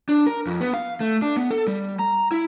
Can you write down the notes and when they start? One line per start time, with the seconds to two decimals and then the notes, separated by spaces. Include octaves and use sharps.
0.09 D4
0.27 A#4
0.47 F2
0.61 B3
0.74 F5
1.00 A3
1.22 D4
1.37 B3
1.51 A4
1.67 G3
1.99 A#5
2.31 E4